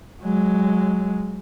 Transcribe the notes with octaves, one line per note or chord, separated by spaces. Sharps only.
F#3 G#3